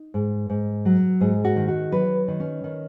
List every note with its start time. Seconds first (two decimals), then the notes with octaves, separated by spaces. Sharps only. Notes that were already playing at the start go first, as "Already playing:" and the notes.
Already playing: D#4
0.14 G#2
0.50 G#2
0.85 F#3
1.21 G#2 G#4
1.45 F#4
1.56 D#3
1.68 F#4
1.92 F#3 B4
2.28 D#3
2.40 C#4
2.64 D#3